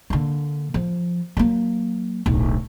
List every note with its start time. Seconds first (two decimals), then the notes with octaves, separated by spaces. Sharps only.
0.10 D3 A#3
0.74 F3
1.37 F#3 A#3
2.26 D1 B1